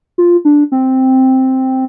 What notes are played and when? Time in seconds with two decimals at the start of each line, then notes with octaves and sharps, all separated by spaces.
0.18 F4
0.45 D4
0.72 C4